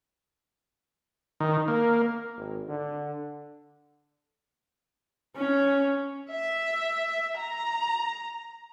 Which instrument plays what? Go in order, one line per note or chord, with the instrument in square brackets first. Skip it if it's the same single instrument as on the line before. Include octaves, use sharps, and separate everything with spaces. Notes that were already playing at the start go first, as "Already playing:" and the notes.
[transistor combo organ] D#3
A#3
[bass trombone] G#1
D3
[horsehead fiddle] C#4
[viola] E5
A#5